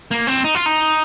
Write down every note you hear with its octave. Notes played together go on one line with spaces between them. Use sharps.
A#3
C4
D#4
F4
D#4